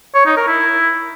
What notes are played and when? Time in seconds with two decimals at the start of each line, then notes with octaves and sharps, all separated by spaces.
0.15 C#5
0.26 D#4
0.37 A#4
0.48 E4